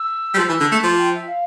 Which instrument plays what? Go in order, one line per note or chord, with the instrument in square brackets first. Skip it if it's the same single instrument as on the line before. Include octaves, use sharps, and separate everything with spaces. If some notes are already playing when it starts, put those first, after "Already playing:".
Already playing: [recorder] E6
[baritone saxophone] G3
F3
E3
D3
A3
[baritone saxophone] F3 [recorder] D6
[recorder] G5
E5
F5